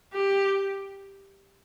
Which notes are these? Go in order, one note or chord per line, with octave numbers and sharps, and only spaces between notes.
G4